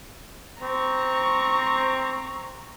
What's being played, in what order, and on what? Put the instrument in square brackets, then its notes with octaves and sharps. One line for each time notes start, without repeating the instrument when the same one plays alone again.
[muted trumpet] C4 [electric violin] A#5 C#6